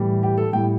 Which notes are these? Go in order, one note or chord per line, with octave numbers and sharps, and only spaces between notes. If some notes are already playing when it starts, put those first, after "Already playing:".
Already playing: A2 E3 G3
G4
A4
A2 G3 G5